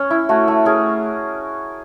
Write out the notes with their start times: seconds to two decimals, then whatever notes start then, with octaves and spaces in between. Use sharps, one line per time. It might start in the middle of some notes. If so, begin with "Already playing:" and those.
Already playing: C#4
0.10 E4
0.29 A3 F#4
0.48 A3
0.65 C#4 G#4 A#4